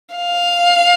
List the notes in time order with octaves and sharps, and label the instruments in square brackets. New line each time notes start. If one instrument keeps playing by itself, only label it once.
[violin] F5